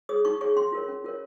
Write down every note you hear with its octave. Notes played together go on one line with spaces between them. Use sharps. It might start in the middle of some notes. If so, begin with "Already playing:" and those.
G#4 C#5 D#6
D#4 C#6
G#4 C#5 C#6
C#4 C6
F4 A#4 C#5
C#4
F4 A#4 C#5